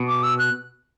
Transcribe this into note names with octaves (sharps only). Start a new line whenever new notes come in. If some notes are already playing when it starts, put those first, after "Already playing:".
Already playing: B2
D6
E6
F#6